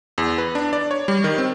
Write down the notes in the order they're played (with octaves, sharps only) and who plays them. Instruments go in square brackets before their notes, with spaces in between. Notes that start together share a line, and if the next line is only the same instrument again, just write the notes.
[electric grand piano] E2
B4
D4
D5
C#5
G3
D#3
C4